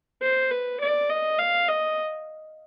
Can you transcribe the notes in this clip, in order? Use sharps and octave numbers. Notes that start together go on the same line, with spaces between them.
C5
B4
D5
D#5
F5
D#5